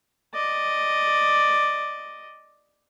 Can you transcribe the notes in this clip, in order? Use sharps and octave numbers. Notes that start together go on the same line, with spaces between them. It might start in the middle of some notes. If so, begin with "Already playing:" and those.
D5 D#5